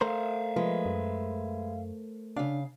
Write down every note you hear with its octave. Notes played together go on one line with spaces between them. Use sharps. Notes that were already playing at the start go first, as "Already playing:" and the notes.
A3 A#4 C5 E5 F5
F3 G#3 B4
F#2
C#3 D4 F5